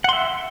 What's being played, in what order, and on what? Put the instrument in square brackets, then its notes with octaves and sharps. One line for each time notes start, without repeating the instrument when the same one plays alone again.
[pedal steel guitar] F#5
C6
E5